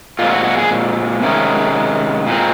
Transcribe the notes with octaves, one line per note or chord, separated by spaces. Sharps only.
A#2 G#3 C4 F4
F#4
F#4
G#4
C3 D#3 G#3 C#4
A#2 G#3 C4